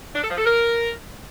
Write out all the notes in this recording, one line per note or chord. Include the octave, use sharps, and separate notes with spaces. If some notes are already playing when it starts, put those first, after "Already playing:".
D4
A4
F3
A4
A#4